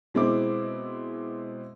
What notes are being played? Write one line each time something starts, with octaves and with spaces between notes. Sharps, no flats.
B2 G#3 C4 E4 D6